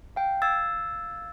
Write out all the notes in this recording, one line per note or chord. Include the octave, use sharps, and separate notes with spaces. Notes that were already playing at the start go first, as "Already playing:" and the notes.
F5 G5
F5 E6 G#6 A6